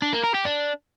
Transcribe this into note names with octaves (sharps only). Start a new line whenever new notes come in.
D4
A#3
A#4
G4
D4